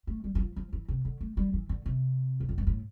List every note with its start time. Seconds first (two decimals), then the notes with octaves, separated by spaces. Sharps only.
0.07 A3
0.24 G3
0.35 E3
0.40 F3
0.56 F3
0.73 E3
0.88 C3
1.05 D3
1.21 A3
1.37 G3
1.53 E3
1.69 D3
1.86 C3
2.40 E2
2.49 F2
2.58 G2
2.67 A2